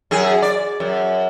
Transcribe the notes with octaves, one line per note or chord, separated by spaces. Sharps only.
F#2 G#4
D5
F#2